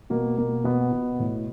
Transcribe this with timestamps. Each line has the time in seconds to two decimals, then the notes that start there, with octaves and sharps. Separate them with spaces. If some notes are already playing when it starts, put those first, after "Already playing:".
0.10 B2 A#3
0.37 B2 A#3
0.64 B2 B3
0.92 B2
1.20 A2